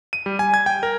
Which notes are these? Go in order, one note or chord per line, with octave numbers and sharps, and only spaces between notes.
D#7
G3
G#5
G#6
G5
A#4